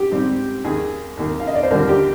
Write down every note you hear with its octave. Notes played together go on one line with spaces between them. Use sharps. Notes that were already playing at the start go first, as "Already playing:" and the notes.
Already playing: G4
G#2 G3 C4 D#4
D#2 D#3 A#3 G#4
D#2 D#3 A#3
F5
D#5
D5
C5
D#2 D3 G3 D4 F4 A#4
G4